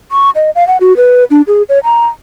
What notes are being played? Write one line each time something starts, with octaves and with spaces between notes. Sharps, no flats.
C#6
D#5
F5
F#5
F#4
B4
D4
G#4
C#5
A#5